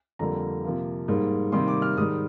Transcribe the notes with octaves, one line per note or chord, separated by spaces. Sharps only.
F2 D3 G3 A#3 A#5
C3 F3 A#3
G#2 G3 A#3
C3 D#3 G3 A#3 C6
D6
F6
G#2 D#3 G3 D#6